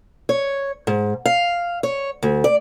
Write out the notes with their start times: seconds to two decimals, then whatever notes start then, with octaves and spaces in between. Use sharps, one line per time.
0.29 C#5
0.87 G#2
1.25 F5
1.83 C#5
2.23 D2
2.44 D5